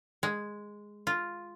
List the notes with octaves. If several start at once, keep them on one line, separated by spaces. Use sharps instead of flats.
G#3
F4